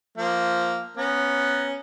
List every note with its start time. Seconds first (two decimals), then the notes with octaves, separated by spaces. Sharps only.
0.18 F3 A#3
0.97 B3 C#4 A#5